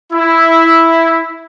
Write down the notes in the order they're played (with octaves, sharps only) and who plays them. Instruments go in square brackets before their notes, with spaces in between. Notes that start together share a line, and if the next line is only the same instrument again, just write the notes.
[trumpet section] E4